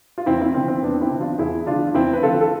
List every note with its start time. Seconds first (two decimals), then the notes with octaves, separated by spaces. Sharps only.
0.18 F4
0.26 E2 C4 E4
0.41 C4 E4
0.54 D3 F3 C4
0.68 C4
0.82 E2 B3 D4
1.01 C4 E4
1.11 D3 F3
1.20 D4 F4
1.38 E2 E4 G#4
1.66 D3 F3 D4 F4
1.94 E2 C4 E4
2.13 B4
2.22 D3 F3 F4 A4
2.41 A4